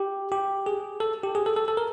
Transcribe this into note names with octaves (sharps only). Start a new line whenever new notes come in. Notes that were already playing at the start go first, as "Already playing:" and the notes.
Already playing: G4
G4
G#4
A4
G4
G#4
A4
A4
A4
A#4